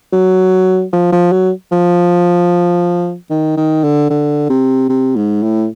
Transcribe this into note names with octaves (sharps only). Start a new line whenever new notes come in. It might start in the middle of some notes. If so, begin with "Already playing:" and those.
F#3
F3
F3
F#3
F3
D#3
D#3
D3
D3
C3
C3
G#2
A2